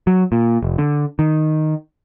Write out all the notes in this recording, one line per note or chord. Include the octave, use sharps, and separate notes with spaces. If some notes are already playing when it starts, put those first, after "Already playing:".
F#3
A#2
F1
D3
D#3